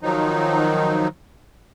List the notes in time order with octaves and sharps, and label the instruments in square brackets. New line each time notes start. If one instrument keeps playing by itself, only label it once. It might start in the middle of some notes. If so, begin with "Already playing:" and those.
[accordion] D#3 F3 F#3 D#4